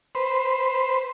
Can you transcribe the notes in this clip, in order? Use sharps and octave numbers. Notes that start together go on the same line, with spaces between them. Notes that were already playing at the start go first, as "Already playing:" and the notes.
B4 C5